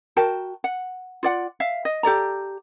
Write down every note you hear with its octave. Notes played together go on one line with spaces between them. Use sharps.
F#4 A#4 G5 A5
F#5
F4 D5 F#5
E5 F5
D#5
G4 A4 D5 A#5